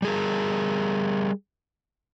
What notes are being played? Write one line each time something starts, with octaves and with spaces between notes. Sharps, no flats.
G3 G#4 A#4